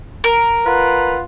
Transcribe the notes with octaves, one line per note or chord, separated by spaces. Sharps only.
A#4
F4 B4 F#5